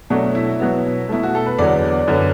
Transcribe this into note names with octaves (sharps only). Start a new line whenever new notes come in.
B2 F#3 A3 D4
E4
B2 F#3 B3
B2 A3 E4
F#4
A4
B4
E2 D3 F#3 B3 D5
F#2 D3 B3